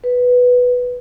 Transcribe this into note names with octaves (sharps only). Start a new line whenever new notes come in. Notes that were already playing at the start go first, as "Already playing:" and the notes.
B4